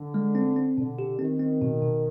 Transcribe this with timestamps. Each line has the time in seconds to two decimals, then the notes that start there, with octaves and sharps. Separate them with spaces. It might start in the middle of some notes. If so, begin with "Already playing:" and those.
Already playing: D3
0.14 G#3
0.35 C4
0.56 C4
0.77 B2 D3
0.99 G4
1.19 D#3 C4
1.40 C4
1.61 B2
1.82 B2